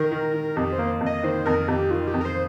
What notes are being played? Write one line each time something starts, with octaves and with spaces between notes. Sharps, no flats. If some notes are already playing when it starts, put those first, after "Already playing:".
Already playing: D#3 A#4
D#3
D#3
F2 G4
C5
A#3
F2
D#5
D#3 C5
F2 A#4
F2 G4
D#3 F4
G4
F2
A#4
C5